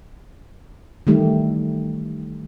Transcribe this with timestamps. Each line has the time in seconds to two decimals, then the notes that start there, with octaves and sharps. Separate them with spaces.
1.07 D#3 E3 G3 A3 D#4 G4